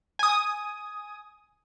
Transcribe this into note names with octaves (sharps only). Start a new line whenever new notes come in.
G#5 D#6